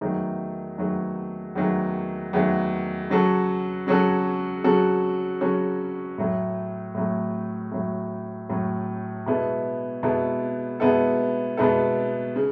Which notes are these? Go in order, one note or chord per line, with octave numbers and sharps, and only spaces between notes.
E2 D#3 F#3 A3
E2 D#3 F#3 A3
E2 D#3 F#3 A3
E2 D#3 F#3 A3
C#3 F#3 C#4 F#4 A4
C#3 F#3 C#4 F#4 A4
C#3 F#3 C#4 F#4 A4
C#3 F#3 C#4 F#4 A4
A2 F#3 A3
A2 F#3 A3
A2 F#3 A3
A2 F#3 A3
B2 G#3 B3 E4 A4
B2 G#3 B3 E4 A4
B2 G#3 B3 E4 A4
B2 G#3 B3 E4 A4
C#3